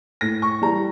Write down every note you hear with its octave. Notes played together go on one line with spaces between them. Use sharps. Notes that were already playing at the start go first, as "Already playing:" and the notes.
A2 A#6
C#6
E3 G3 A#5